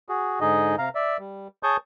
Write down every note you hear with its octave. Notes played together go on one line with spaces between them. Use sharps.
F#4 G#4
G#2 D3 D#4 G#4 D#5
C3 F5 A#5
D5 E5
G3
G#4 C#5 A5 C#6 D#6 G6